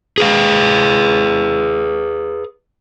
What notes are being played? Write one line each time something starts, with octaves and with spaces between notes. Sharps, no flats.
G#4 B4 F5